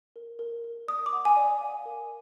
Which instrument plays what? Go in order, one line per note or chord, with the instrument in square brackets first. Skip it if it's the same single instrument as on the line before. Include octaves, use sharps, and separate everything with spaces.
[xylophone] A#4
A#4
A#4
D5 D#6
D6
F#5
G#5
D5
F5
A#4